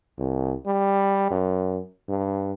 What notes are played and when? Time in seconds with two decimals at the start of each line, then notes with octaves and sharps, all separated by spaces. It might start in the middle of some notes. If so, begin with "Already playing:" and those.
0.18 C2
0.66 G3
1.31 F#2
2.09 G2